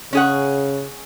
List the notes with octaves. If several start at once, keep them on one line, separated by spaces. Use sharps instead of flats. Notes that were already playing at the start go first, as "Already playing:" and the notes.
C#3 C#4 G#4 F#5